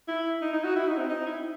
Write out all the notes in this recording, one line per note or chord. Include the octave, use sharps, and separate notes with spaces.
E4
D#4
D#4
F#4
E4
D#4
C4
D#4
E4